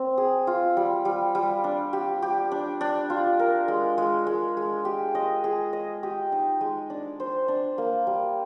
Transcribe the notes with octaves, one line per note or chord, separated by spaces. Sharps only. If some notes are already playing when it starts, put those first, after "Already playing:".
Already playing: C4
G#4
F4
G3
G3
G3
D4
G4
G4
D4
D4
F4
A#4
G#3
G#3
G#3
G#3
G4
D#5
G#4
D#5
G4
D#4
G#3
D4
C5
D4
A#3
G3